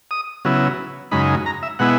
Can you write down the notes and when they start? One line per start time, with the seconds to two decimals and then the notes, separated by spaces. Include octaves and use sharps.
0.11 D#6
0.45 C#3 F#3 B3 E4
1.11 F#2 C#3 G#3 D#4 B5
1.46 A#5
1.63 E5
1.79 B2 G#3 B3 E4 F#5